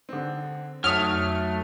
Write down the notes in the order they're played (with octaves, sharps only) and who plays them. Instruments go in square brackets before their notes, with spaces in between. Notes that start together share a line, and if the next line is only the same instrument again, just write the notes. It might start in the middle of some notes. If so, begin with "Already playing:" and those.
[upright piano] D3 C4
[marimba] F2 [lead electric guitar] F#3 A3 [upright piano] C#5 D#6 [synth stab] F6